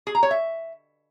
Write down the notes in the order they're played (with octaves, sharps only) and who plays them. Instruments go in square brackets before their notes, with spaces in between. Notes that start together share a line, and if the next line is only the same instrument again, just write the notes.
[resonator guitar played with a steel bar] G#4
A#5
C#5
E5